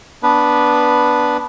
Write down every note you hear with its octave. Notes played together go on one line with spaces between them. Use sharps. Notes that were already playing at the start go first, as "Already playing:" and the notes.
B3 D4 B4